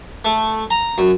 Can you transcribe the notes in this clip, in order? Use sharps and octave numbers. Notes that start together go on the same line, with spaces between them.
A3
A#5
F#2